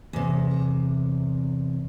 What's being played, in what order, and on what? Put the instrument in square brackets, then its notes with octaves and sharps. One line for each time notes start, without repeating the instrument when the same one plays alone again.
[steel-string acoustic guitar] E2 C3